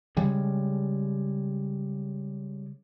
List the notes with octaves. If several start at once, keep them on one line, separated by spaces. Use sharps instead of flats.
C#3 G3 G#3